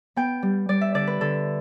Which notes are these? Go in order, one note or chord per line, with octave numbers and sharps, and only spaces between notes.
B3 G5
G3
G3 D5
E5
D3 D5
B4
D3 A4